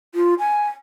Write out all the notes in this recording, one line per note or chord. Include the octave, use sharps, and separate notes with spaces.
F4
G#5